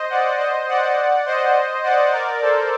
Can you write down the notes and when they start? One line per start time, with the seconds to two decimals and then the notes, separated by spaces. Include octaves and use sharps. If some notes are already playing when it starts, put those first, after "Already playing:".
Already playing: C5 D#5
0.10 D5 F#5
0.40 C5 D#5
0.68 D5 F#5
1.26 C5 D#5
1.84 D5 F#5
2.13 A#4 D5
2.42 A4 C5